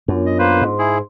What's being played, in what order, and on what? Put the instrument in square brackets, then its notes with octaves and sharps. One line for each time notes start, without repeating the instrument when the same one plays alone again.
[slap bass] F#2 [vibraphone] B3 D4 F4
[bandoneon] D#5
A#3 B4 C5
[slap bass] G#2 [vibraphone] C6
[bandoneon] E4 G#4